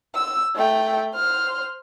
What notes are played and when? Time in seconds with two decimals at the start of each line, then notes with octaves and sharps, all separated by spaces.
0.15 E6
0.55 A3 G5
1.14 C5 F6